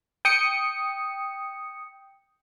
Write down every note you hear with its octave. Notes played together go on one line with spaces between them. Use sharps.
G5 D#6 C#7